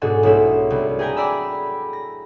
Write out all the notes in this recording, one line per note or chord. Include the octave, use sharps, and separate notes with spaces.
G#2 B2 D4 F#4 G#4 A4
B1 A3 E4 E7
C2
G#4 A#4 B4 G5 G#5 A#5
D5 A#5 B5 E6
A#6